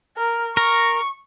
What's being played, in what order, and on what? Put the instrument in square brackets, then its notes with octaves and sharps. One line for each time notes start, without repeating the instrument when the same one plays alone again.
[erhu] A#4
[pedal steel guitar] A#4 [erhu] C#6